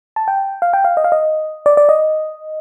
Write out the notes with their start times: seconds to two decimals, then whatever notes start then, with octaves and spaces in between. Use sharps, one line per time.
0.16 A5
0.28 G5
0.62 F5
0.73 G5
0.84 F5
0.97 D#5
1.04 F5
1.12 D#5
1.66 D5
1.77 D5
1.89 D#5